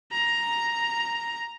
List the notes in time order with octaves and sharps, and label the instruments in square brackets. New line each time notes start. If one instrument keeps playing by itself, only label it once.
[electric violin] A#5